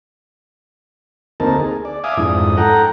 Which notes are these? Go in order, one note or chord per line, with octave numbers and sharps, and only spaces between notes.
D2 A#3 C4 D#4 A#4 A5
G#4
D5
E5 F5 G#5 D6 D#6
F2 G#2 D4 E4 D#6
A4 F#5 G5 A#5